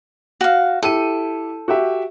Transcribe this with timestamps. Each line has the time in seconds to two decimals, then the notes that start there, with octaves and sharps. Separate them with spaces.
0.41 F#4 F5
0.83 E4 G4 A4 D#7
1.68 F#4 G4 E5